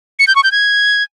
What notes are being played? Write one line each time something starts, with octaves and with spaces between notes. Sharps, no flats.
C#7
G6
C#6
G6
G#6